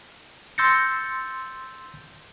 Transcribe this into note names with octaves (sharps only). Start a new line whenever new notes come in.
C6 E6 G6 A6 A#6 C#7